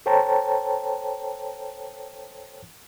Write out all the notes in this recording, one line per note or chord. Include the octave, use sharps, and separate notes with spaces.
A4 C5 C#5 G5 A5 A#5